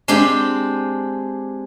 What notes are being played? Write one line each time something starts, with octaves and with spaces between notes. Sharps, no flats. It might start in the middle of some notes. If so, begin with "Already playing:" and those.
G#3 C4 D4 G4